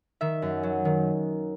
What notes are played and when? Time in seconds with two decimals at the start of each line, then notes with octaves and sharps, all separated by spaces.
0.21 D#3 E5
0.42 F#2
0.63 F#3
0.85 D#3